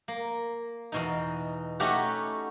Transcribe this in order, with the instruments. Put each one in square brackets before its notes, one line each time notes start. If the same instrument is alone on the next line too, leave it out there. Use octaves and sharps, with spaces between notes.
[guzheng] A#3
E2 B2 D#4
A3 C#4 D#4 F#4 G4 F#5